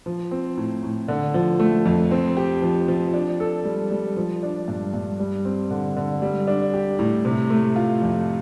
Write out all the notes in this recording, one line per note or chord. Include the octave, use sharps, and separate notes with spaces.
F3
C4
A2
A2
D3
F3
A3
F2
C4
G4
F3
F3
D4
A4
G3
G3
F3
D4
G2
G2
G3
C4
D3
D3
G3
D4
G4
A2
C3
A3
F4
F2